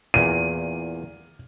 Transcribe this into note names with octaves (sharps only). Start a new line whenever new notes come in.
E2 A#2 D#7